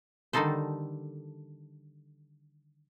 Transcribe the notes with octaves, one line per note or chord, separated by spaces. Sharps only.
D3 D#3 G3 D#4 A4 C5